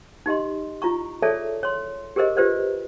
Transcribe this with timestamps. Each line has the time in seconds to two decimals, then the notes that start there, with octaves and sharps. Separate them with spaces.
0.26 D#4 G4 D#5 C6
0.82 E4 F4 A#5 C#6
1.22 G#4 A4 C#5 D5 E5 A5
1.63 C#5 C6
2.16 G4 G#4 A#4 C5 D#5
2.37 F4 G4 B4 C5 D5